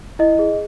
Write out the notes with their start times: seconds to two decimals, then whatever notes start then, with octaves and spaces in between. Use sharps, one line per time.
0.19 E4 D#5
0.39 G#4